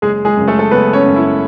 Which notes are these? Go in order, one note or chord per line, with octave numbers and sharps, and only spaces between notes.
F#1 G#3 G#4
G#3 G#4
F#2 C#3
A3 A4
A4
F#1 B3 B4
C#4 C#5
F#2 C#3
E4